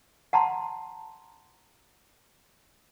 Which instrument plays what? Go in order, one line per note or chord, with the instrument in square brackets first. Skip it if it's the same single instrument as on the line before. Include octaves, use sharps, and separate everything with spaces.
[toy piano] F#5 A5 A#5 C6